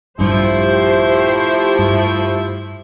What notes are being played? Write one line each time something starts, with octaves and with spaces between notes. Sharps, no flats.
A#1 G2 F3 G3 A3 E4 G4 C5
G2